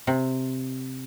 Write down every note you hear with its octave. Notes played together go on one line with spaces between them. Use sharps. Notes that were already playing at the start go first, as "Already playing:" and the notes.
C3